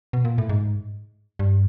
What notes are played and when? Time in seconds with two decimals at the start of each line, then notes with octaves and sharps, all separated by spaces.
0.13 B2
0.25 A#2
0.38 A2
0.49 G#2
1.39 G2